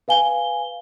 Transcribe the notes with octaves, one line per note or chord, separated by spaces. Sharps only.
B4 F5 G#5 G7